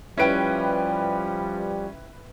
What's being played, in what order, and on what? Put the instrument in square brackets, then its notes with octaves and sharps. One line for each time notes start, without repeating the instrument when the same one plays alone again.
[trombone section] F3 G3 [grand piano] C#4 D7 [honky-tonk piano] E4 B4 G5